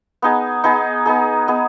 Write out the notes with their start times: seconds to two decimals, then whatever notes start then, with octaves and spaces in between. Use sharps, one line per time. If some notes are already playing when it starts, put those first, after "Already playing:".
0.22 B3 D#4 G#4
0.64 B3 D#4 G#4
1.06 B3 D#4 G#4
1.48 B3 D#4 G#4